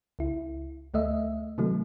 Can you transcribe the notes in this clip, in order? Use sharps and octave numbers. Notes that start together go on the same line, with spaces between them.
C#2 E4
D2 A3 D#5 E5
C3 D#3 F#3 A3 D#4